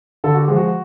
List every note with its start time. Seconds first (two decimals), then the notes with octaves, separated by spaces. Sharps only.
0.24 D3 A4
0.35 F#4
0.40 G4
0.48 F3 G#3
0.56 F#4